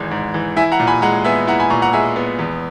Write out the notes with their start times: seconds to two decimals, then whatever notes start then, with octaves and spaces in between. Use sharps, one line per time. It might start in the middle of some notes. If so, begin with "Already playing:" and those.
Already playing: G#1 G#2 E3 G#3
0.11 G#2
0.34 E3
0.57 E4 E5 G#5
0.72 F#5 A#5
0.80 A#2
0.87 G#5 B5
1.02 G#3 F#5 A#5
1.25 B3 E5 G#5
1.47 E4 F#5 A#5
1.60 G#5 B5
1.70 A#2 A#5 C#6
1.82 F#5 A#5
1.93 G#3 E5 G#5
2.16 B3
2.39 E2